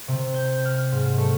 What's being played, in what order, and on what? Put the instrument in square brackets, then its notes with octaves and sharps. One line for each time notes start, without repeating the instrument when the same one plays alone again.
[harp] C3
G6
F6
G#2
A3